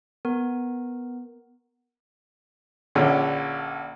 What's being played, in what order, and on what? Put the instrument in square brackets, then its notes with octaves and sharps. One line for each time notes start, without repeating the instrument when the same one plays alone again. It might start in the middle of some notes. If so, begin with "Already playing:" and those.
[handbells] B3 A#4
[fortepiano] A#1 D3 C#4